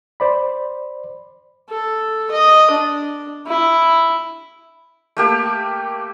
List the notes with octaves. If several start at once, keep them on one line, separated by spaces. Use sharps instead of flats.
C5 D5 B5
A4
D#5
D4
E4
A3 A#3 G4